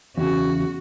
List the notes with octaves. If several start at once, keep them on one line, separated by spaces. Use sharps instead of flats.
E2 C#3 F#4